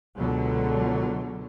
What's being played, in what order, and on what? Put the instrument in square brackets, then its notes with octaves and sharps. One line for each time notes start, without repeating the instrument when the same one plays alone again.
[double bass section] C#2 B2 D3 F#3